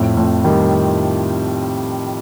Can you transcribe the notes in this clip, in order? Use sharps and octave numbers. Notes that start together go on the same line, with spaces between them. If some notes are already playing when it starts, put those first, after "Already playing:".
Already playing: F2 A2
F2 A2
D#3 G3